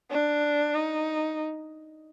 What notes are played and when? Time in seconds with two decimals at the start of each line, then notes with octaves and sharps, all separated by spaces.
0.10 D4
0.74 D#4